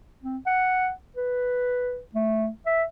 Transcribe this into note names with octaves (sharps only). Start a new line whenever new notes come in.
C4
F#5
B4
A3
E5